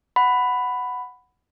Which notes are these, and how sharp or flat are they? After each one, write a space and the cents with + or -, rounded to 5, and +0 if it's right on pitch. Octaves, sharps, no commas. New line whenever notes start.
F#5 +0 B5 +10